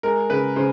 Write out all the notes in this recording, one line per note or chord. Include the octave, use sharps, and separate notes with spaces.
G#3 A#4
C#3 B4
C#3 C5